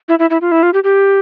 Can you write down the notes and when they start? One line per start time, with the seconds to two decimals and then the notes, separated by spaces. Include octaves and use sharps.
0.09 E4
0.19 E4
0.30 E4
0.41 F4
0.52 E4
0.63 F4
0.74 G4
0.84 G4